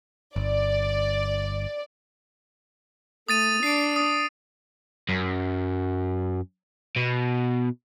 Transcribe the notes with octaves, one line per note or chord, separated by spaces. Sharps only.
G1 D5
A3 D#6 A6 D#7
D4 C7 D7
D#6
F#2
B2